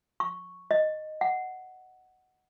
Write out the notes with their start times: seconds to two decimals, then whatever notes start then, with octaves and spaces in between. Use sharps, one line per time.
0.20 C#6
0.71 D#5
1.21 F#5